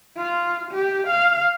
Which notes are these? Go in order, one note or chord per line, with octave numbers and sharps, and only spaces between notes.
F4
G4
F5